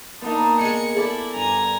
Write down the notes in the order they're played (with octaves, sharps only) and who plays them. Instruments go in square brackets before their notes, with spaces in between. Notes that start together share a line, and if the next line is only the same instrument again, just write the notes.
[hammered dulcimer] A#3 B3 [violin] D4 D#4
[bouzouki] G#3 G#4 [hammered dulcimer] G#5 [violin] C#7
[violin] E4 [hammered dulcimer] A4 G#5 [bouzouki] D5
[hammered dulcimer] G2 [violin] G#5 A#5